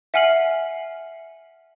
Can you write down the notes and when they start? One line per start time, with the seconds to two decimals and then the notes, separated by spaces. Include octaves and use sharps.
0.14 E5 F#5 G#5 F6 C7 F#7